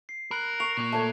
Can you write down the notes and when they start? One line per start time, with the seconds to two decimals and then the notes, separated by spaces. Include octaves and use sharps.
0.09 C7
0.31 A#4 B5 F#6 F#7
0.60 C#6 C7 F7
0.77 A#2 A#3
0.92 A3 C#5 A#5